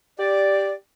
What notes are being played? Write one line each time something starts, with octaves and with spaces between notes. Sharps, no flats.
G4 D5